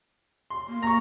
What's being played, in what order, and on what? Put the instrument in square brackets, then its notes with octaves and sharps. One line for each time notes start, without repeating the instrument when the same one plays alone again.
[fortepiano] C6
[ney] A#3
[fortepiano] A#5 C#6